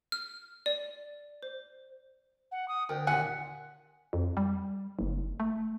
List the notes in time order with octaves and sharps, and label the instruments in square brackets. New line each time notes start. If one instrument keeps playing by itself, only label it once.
[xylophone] F6
D5
C5
[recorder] F#5
D#6
[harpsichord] D2 [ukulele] A#4 [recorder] G5
[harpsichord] D#2 A#2 [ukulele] D#4 G#5 [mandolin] F#5
[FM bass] F2
G3
F#1
A3